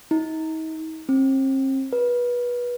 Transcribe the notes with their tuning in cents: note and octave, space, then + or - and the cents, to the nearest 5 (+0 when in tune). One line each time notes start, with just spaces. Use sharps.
D#4 +40
C4 +40
B4 -25